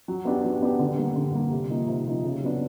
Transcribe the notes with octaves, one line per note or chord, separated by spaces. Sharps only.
F#3
B3 D4 G4
F#3
B3 D4 G4
D3
G3 A#3
D3
G3 A#3
C3
F3 A#3 D#4
C3
F3 A#3 D#4
C#3
F#3 B3 D4